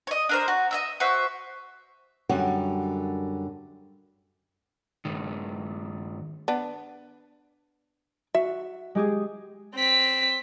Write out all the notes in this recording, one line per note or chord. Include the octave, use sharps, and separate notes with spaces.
C#5 D#5
D4 A#4 C5
F#4
D#5 E5 E6
F#4 C5 E5
F#2 D3 G3 F#4 F#5
G2 D#3
B3 D4
F#4 E5
G#3 G4 G#4
C4 B6